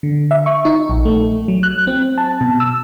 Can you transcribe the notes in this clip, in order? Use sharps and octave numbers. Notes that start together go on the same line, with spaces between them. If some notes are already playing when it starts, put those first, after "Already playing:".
D3
E5
C#6
D#4
A#1
A3
F#3
F#6
C4
A5
B2
E6